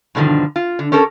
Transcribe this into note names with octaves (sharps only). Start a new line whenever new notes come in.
G2 B2 D3 D#3 F3
F4
D3
C#4 G4 A4 A#4